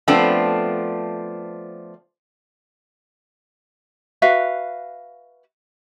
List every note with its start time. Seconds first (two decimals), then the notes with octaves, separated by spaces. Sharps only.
0.08 F3 A3 B3 C4 D4
4.22 F#4 B4 E5 F5